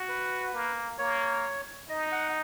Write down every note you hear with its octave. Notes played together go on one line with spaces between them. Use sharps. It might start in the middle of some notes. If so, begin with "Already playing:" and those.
Already playing: F#4
B4
A#3
A#3 C#5
D#4 D#5
F#5